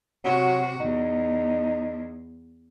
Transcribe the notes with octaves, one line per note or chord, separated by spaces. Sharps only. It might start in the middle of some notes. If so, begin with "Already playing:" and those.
C3 F#3 F#4
E2 D#4